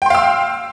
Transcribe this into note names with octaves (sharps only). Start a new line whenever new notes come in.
F5 G5 C6 E6